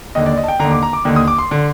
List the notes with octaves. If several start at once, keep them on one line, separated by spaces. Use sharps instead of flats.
D#2 D3 D#5
D5
D#5
A5
G5
D#2 D3 A#5
D6
A#5
D6
D#2 D3
D#6
D6
C6
D3